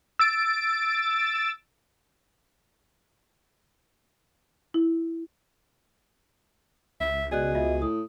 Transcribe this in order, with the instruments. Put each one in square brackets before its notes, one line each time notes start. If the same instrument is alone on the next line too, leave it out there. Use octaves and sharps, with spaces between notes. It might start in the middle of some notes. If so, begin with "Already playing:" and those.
[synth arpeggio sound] E6 A6 D7
[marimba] E4
[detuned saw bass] C#2 [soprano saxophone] E5
[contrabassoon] B2 [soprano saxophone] G#4 [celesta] D5 D#5 F#6
[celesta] F4 D#5 E5
[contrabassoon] A2 [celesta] D#6